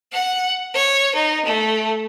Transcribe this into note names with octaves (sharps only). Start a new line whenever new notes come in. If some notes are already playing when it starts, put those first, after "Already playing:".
F#5
C#5
D#4
A3